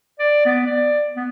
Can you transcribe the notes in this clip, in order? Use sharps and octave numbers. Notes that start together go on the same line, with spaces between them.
D5
B3
D5
B3